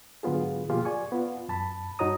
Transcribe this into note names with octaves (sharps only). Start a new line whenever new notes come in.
G#2 D3 F#3 B3 F4 G#4
B2 F3 A#3 F4 G4 G#4
D5 G#5 C#6
B3 F4
F#2 A5 B5
G2 D#4 F#4 C#5 A#5 D#6